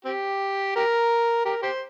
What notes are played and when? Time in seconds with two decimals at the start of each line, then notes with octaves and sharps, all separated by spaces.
0.05 C4 G4
0.76 G4 A#4
1.45 G4 A#4
1.62 G4 C5